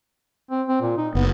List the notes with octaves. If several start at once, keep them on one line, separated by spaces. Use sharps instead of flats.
C4
C4
A#2
D#4
F#1 B3